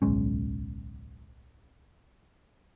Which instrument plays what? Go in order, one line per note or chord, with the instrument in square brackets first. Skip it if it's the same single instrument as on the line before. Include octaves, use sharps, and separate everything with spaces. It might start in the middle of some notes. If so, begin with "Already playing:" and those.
[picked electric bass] D1 B1 G#3 C#4